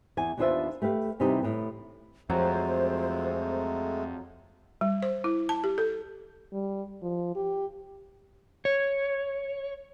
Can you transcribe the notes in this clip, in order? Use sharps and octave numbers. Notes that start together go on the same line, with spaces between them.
E2 G#5
D#2 B3 D4 F4 C5 E5
A3 G4 B4 F5
E2 C3 E3 G3 D#4
A2 B3
F2 F#3 G#3 A3 C4 C5
G3
C5
E4
A5
G4
A4
G3
F3
G4
C#5